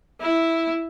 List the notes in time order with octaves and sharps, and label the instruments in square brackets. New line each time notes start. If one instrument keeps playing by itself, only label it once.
[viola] E4